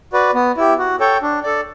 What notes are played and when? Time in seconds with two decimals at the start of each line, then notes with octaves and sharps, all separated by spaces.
0.13 F#4 B4 D5
0.34 B3
0.57 E4 G4
0.78 F#4
1.00 A4 C#5 G5
1.22 D4
1.43 A4 D5